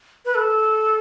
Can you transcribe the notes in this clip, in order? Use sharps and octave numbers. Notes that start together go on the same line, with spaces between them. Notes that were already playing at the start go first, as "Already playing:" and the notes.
B4
A4